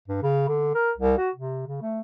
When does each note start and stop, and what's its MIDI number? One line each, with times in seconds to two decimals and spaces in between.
0.08 0.20 43
0.22 0.44 49
0.48 0.71 50
0.74 0.91 70
0.97 1.17 36
1.18 1.30 66
1.35 1.64 48
1.67 1.80 49
1.82 2.01 57